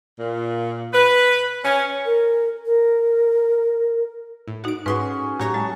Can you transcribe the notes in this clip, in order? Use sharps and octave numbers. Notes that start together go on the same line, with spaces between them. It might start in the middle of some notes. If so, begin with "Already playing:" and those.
A#2
B4
C#4
A#4
A#4
A2
D#4 F#4 F#5 D7
G#2 C#4 F#4 G#4 B4 C6 C#6
A2 F#3 G4 C#5 A#6
G#3 A5